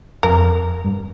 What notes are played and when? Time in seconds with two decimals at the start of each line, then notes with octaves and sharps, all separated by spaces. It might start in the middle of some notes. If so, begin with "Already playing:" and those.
0.23 F2 A#4
0.84 G2